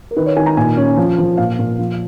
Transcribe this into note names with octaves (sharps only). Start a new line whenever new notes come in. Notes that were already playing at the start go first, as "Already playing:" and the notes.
A#4
D#3 B4
C#5
D#3 G#5
A#5
A#2 G#5
C#4
F3
F3
A#2 F5
A#2
F3